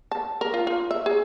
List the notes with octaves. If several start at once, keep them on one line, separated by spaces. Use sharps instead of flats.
A5
A#4
F4
F4
E5
G#4